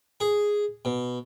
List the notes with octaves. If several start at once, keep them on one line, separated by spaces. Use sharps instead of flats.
G#4
B2